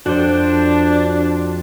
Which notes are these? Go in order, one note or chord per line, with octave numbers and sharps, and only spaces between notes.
F2 D4 F#4 C5